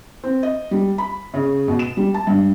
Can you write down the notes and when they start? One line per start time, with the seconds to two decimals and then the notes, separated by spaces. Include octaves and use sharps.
0.24 C4
0.43 D#5
0.71 G3
0.98 B5
1.34 C#3
1.68 B2
1.79 E7
1.97 G3
2.14 A5
2.27 G2